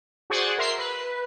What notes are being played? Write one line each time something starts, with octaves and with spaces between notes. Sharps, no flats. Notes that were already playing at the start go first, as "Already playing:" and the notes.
F#4 G#4 C5 D5 F#5
A#4 E5 C6 C7
B4